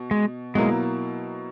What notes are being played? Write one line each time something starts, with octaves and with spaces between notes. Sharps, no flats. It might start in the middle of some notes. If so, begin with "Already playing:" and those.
Already playing: B2
G#3
B2 F#3 G#3 A#3 E4